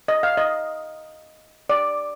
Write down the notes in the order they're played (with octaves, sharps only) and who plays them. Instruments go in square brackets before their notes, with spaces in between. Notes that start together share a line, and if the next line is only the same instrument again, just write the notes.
[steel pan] D#5
F5
D#5
D5